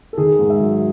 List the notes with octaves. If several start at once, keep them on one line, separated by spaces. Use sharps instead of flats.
A4
D#3 G#4
G#2
E5
F#3